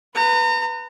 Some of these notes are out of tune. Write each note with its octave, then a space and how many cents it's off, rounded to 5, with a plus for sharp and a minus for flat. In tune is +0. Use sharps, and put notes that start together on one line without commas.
B4 +0 A#5 -35